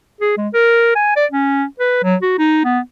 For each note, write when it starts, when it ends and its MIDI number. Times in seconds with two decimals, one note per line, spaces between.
0.21 0.35 68
0.37 0.49 56
0.54 0.92 70
0.95 1.13 80
1.16 1.26 74
1.31 1.64 61
1.80 2.02 71
2.03 2.16 54
2.22 2.37 66
2.39 2.60 63
2.64 2.80 59